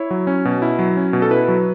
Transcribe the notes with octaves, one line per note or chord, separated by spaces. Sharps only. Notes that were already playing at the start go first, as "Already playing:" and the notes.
Already playing: E4 C#5
F#3
C#4
B2
E4
F#3
C#4
B2
A4
E4 B4
F#3